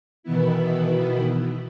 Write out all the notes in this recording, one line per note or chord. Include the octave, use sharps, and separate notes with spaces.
B2 D#3 E3 B3 E4